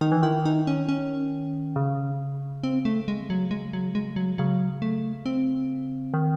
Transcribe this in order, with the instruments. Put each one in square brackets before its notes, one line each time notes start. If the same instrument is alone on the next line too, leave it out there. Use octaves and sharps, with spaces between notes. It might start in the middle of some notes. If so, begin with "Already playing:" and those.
[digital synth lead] D#3 [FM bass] D#4
[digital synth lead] E3
[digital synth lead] D#3 [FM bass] E4
[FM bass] D#4
C#4
C#4
[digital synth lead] C#3
[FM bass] C4
A3
G#3
F#3
G#3
F#3
G#3
F#3
[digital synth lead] C#3 [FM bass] F#3
[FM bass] A3
C4
[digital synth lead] D#3